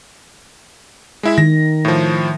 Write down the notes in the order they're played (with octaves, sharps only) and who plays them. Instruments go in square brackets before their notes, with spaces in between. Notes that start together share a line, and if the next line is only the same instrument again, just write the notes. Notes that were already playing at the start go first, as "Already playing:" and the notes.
[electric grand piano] G#3 E4 E5
[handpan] D#3 [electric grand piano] A#6
[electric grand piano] A2 F3